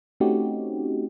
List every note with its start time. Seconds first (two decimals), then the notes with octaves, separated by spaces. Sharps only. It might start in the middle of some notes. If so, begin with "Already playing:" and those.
0.20 A3 C4 C#4 D#4 F#4 G4